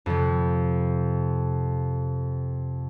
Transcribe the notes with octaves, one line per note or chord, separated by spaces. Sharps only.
F2 C3